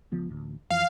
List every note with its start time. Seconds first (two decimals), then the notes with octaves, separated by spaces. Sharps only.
0.12 C#2 F3 B3
0.29 A1 D2
0.70 F2 E3 F5